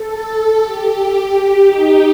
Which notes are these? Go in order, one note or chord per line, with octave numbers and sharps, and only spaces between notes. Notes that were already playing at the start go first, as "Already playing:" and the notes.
Already playing: A4
A4
G4
D#4